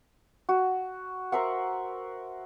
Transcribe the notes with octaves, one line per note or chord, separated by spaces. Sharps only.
F#4
A#4 C5 E5 F#5